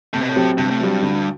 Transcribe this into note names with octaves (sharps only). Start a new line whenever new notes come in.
A2 C3
B2
A2
F#3 C4 G4
G2 C3
A2
G2 F#3 C4 G4
D2